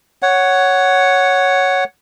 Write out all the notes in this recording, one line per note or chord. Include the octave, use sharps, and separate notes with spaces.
C#5 F#5